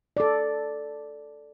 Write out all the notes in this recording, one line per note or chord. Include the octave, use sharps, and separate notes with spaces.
A4 D5